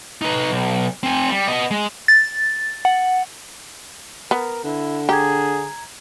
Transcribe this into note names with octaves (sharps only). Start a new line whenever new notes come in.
D#4 B4
B1
C4 G#5
G3
B3 D#5
G#3
A6
F#5
B3 A#4
D3 E4
G4 G#4 A#5 G#6